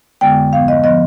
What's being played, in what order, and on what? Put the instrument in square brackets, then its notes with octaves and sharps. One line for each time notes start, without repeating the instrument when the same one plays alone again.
[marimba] F2 D3 G#3 B3 G5
G#2 F3 B3 F5
D#5
F3 B3 D#5